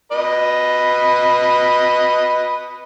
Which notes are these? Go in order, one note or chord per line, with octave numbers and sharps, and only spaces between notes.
B4 D#5